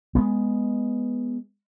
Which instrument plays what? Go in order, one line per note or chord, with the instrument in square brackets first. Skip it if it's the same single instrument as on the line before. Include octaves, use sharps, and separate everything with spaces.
[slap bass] G#3 A#3 B3